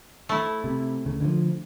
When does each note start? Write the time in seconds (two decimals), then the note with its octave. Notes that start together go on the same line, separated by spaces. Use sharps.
0.29 A3 E4
0.64 C3
1.05 D2 C#3
1.20 D3 D#3 F3